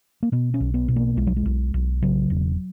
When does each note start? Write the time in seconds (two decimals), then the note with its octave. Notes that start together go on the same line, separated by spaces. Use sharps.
0.23 A#3
0.32 B2 B3
0.54 C#4
0.60 B1
0.74 B3
0.88 B2
0.96 A#3
1.17 B1 G#3
1.27 F#3
1.36 G#3
1.46 B1
1.74 B1
2.02 C#3 F#3
2.30 E1